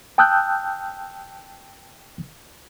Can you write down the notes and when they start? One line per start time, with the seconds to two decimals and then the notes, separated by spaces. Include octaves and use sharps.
0.18 G5 A5 D#6 E6 F#6 G6